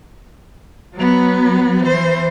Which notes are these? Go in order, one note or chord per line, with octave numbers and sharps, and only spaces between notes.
F#3 B3
E3 C5